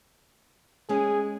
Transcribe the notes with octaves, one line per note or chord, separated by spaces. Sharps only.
G#3 C#4 G#4